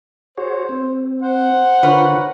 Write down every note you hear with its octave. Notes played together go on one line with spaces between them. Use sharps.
F#4 G#4 C5 C#5
C4
C5 F#5
D3 F4 A#4 B4 C#5